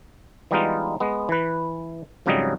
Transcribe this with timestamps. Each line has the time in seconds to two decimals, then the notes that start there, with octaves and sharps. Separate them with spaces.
0.51 E3 G3 G#3 B3 D#4 F4
1.00 G#3 B3
1.29 E3 B4
2.26 F2 G#2 C#3 F#3 G3 D#5